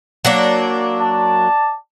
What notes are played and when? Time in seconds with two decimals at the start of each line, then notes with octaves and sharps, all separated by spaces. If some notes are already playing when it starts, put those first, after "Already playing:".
0.25 F#3 A#3 D4
0.99 D5 A5